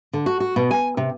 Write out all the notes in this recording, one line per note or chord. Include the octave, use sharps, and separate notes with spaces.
D3
F#4
F#4
B2
G#5
C3